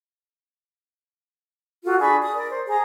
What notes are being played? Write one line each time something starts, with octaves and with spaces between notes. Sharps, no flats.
F4 F#4 A4
D4 G#4 B5 C#6
D#6
A#4 D5
C5
G#4 A#5